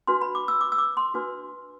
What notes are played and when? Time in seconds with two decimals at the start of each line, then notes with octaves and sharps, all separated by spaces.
0.07 D4 F#4 B4 C6
0.22 B5
0.35 D6
0.48 E6
0.61 D6
0.72 E6
0.78 D6
0.97 C6
1.14 D4 F#4 B4